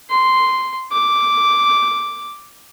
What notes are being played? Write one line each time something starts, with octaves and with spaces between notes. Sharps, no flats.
C6
D6